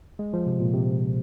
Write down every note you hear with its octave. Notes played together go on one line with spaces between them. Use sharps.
G#3
F3
C3
A#2
C3